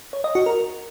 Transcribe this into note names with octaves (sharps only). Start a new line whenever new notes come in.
C#5
D#5
F#4
A#4